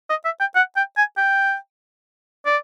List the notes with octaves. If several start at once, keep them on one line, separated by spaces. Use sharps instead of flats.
D#5
E5
G5
F#5
G5
G#5
G5
D5